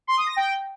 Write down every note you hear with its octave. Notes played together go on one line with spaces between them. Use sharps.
C6
D#6
A#6
G5